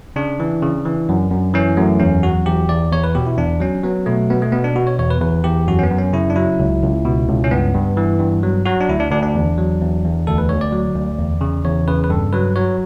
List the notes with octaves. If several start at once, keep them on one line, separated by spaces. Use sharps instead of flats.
C#3 D4
E3
C#3
E3
F#2
F#2
E3 C#4
F#2 A3
E2 C#4
F#3 F#4
E2 G4
E2 D5
E2 C#5
B4
B2 G4
E4
E2 D4
F#3 C#4
F#3 B3
B2 A3
B2 B3
A3
B2 B3
D4
B2 F#4
C#5
E2 C#5
B4
E2 B4
E2 G4
F#2 F#4
C#4
B3
F#2
C#4
C#3 E4
D4
F#3 E4
C#2
C#2
B2
C#2
C#4
G2 B3
G2
E3
G2
F#3
F#3 F#4
D4
D2 E4
D4
D2 D4
D4
E2
F#3
E2
E2
D2 A4
B4
D2 C#5
D5
F#3
D2
E2
C#3
E2 C#5
C#3 B4
B4
G2 A4
F#3 B4
F#3 C#5